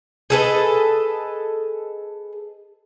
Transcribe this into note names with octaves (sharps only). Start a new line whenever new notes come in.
G#4 A4 B4 D#5